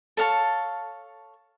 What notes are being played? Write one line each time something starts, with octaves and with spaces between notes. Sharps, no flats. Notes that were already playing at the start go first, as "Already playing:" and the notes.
A4 C#5 F5 A5